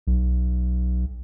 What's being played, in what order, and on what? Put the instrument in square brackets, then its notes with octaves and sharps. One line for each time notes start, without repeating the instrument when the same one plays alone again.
[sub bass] B1